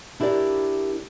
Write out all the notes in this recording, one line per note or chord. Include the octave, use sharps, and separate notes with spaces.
D4 E4 G4 A#4 D5